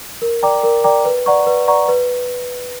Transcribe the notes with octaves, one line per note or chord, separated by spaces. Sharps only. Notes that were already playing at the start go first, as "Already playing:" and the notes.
A#4
D5 G5 A#5 D6
A#4
D5 G5 A#5 D6
B4
D5 F#5 A#5 C#6
B4
D5 F#5 A#5 C#6
B4